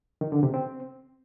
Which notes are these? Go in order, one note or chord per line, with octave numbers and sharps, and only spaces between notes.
D#3
D3
C3
C4